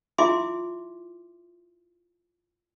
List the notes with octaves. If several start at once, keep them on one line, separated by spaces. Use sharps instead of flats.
E4 F4 E5 G#5 C6 D6